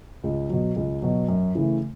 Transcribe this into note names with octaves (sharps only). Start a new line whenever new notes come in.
C#2
B2 F#3
C#2
B2 F#3
F#2
C#3 E3 A3